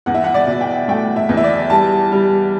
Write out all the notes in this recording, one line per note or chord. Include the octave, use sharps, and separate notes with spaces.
E2 F#5
E5
F#5
D5
B2
G5
A3 G5
E5
E2
E5
D5
G3 A5
G3